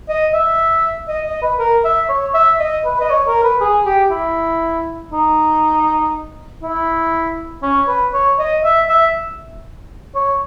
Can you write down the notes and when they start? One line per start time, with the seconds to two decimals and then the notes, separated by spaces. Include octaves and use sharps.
0.09 D#5
0.34 E5
1.08 D#5
1.26 D#5
1.42 B4
1.59 A#4
1.84 E5
2.09 C#5
2.34 E5
2.60 D#5
2.85 B4
3.00 D#5
3.10 C#5
3.27 A#4
3.44 B4
3.61 G#4
3.85 G4
4.10 E4
5.12 D#4
6.63 E4
7.63 C#4
7.88 B4
8.13 C#5
8.39 D#5
8.64 E5
8.89 E5
10.15 C#5